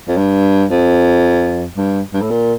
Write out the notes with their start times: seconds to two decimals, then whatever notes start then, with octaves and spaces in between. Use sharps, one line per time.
0.08 F2
0.17 G2
0.70 F2
1.77 G2
2.14 G2
2.22 A2
2.30 A#2